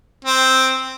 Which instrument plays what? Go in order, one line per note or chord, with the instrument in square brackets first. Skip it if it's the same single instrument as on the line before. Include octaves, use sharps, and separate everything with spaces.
[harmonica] C4